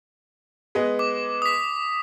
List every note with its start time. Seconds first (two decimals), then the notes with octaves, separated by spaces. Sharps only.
0.75 G#3 B3 D#5
0.99 D6
1.42 D#6 B6